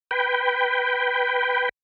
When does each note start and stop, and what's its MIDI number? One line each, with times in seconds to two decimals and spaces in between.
0.11 1.69 71
0.11 1.69 79